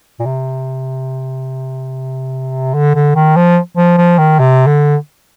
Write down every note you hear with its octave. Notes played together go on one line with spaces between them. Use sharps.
A#2
C3
D3
D3
D#3
F3
F3
F3
D#3
C3
D3